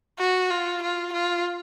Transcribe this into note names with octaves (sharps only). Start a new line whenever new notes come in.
F#4
F4
F4
F4